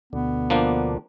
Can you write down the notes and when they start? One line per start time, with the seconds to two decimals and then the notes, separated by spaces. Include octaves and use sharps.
0.13 D2 B2 D3 B3
0.50 F3 A#3 D4